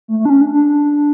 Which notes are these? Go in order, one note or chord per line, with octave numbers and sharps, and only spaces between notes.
A3
A3
D4
C#4
D4
D4